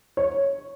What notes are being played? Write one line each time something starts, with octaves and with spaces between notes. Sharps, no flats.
C#5